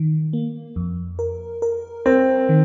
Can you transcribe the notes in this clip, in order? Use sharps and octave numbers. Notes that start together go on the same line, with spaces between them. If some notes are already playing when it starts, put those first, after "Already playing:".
Already playing: D#3
A#3
F2
A#4
A#4
C4 A#4
D#3